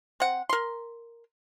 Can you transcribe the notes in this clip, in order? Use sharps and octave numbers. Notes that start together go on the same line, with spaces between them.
C4 F#5
A#4 C6